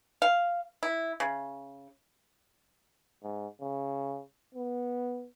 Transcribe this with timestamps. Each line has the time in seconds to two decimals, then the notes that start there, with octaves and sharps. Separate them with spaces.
0.22 F5
0.83 E4
1.20 C#3
3.23 G#2
3.61 C#3
4.54 B3